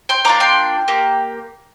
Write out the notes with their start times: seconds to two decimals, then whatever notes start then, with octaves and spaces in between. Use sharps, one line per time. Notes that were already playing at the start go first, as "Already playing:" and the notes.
0.09 G5 C6
0.25 A#3 D4 F4 A#5 D6
0.40 G5 C6
0.88 A#3 G4